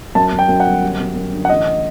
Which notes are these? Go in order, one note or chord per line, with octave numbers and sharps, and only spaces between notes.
F#2 A5
F#2
G5
F#2
F#5
G1
G3
F#2
F#2
D3
F#5
A1 D#5